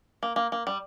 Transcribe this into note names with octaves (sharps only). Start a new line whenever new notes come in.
A#3
A#3
A#3
G3